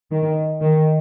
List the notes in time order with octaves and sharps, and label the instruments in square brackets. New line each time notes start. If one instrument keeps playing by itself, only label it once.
[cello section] D#3
D#3